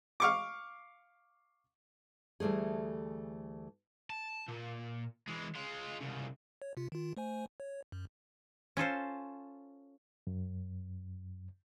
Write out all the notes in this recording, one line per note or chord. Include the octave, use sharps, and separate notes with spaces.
F5 C#6 D6
D2 E3 G3 A3 G#4
A5
A#2
E3 G#3
G#3 F4
C2 C#3
C#5
C3 F4
D#3 F4
A3 C5 G#5
C#5
F#2
C#4 F4 A4 C5
F#2